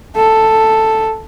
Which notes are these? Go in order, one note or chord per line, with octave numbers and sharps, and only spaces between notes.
A4